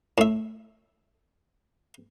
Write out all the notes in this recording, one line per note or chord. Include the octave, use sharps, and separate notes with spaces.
A2 E5